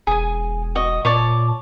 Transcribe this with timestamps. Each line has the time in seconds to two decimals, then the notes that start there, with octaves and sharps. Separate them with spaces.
0.07 E1 G#4 G#5
0.75 F#4 D#5
1.05 A#2 C#5 D5 A5